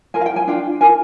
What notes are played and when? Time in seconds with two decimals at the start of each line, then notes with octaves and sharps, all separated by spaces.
0.14 F4 A#4 G#5
0.21 F5
0.26 G5
0.36 G#5
0.48 D4 F4 G5
0.81 F4 A#4 G#5